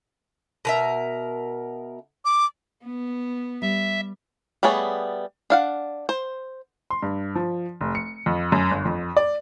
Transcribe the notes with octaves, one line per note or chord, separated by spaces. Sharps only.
B2 A#4 E5
D6
B3
G3 E5
G3 A3 B3 G#4 C#5
D4 F5 F#5
C5
C6
G2
F3
F1
C#7
F2
F#2
G1
F2
D5